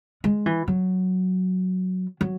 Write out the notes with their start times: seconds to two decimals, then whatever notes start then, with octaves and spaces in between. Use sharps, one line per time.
0.24 G#3
0.46 E3
0.68 F#3
2.21 F#3